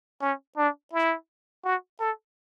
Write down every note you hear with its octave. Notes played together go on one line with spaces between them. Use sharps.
C#4
D4
E4
F#4
A4